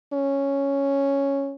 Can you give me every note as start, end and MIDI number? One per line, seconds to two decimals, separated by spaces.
0.13 1.56 61